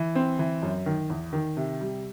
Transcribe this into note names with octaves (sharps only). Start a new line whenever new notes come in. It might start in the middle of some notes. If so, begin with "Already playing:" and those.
Already playing: E3
C4
E3
F#2
D#3
E2
D#3
C3
G3